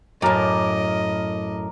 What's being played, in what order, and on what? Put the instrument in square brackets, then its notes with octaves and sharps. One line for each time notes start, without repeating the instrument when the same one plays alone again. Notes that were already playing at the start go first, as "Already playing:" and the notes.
[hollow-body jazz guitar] F#2 A2 [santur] A#4 A#5 D6 [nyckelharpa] D#5